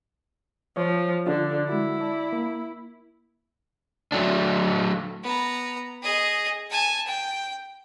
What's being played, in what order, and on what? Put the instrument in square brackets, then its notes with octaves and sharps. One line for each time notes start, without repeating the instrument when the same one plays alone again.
[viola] F3 [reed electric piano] C5 C#5
[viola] D3 [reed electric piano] D4 F4
[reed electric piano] G#3 F#4 [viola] E4
[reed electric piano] D5 A5
A#3
[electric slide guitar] F#3 A3 D4
[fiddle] B3 A#5
G#4 D#5
G#5 A5
G5